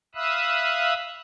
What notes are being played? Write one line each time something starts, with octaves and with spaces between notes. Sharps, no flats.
E5 F5 B5 D#6 E6 F#6